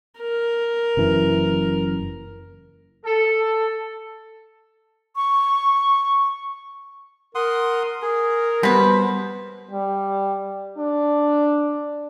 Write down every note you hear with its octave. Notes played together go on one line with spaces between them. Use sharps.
A#4
F#1 F#2 E3
A4
C#6
A#4 F#5 C6 D#6
G#4 A#4
B2 G3 B3 B4 C5
G3
D4